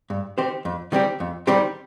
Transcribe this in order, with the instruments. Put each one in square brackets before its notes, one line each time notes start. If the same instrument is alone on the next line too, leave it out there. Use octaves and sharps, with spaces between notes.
[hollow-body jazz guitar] G2
D#3 C4 G4 C5
F2
D#3 G3 C4 G4
F2
D#3 G3 C4 G4